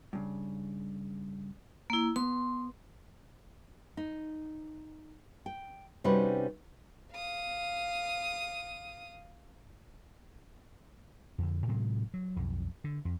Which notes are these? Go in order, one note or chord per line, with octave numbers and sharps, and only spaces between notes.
G2 C#3
A#3 E4
B3 C6
D#4
G5
C3 G3 C#4 D#4 F#4 B4
F5 D#6
F2 D3
A2 C3 F#3 G#3
F#3
B1 F2
D3
F2